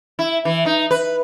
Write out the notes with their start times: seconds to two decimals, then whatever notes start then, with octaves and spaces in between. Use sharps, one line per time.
0.19 E4
0.45 E3
0.66 D#4
0.91 B4